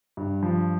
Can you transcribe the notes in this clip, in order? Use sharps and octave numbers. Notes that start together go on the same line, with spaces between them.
G2
F3